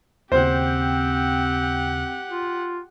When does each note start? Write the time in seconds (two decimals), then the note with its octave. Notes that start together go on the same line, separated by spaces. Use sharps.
0.32 D#2 C#3 C4 G4 C5 F#5
2.30 F4